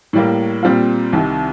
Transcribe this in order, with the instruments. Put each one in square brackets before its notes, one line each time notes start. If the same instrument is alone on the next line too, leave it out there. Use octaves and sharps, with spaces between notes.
[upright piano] A2 G3 A#3
A#2 G3 C4 F4
C2 C3 D#3